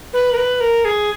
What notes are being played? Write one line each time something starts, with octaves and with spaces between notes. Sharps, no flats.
B4
A#4
B4
A#4
G#4